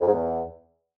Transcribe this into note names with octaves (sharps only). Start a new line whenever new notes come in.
F2
G#2
E2